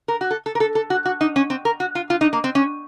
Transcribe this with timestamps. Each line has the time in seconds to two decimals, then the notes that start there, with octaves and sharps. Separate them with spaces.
0.08 A#4
0.21 F#4
0.31 A4
0.46 A4
0.55 A#4
0.60 A4
0.75 A4
0.90 F#4
1.06 F#4
1.21 D#4
1.36 C#4
1.50 C4
1.65 A#4
1.80 F#4
1.95 F4
2.10 F4
2.21 D#4
2.33 A#3
2.44 C4
2.55 C#4